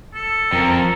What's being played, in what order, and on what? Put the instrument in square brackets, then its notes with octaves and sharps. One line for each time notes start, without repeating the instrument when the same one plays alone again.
[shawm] A4
[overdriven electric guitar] F2 [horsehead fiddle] A#4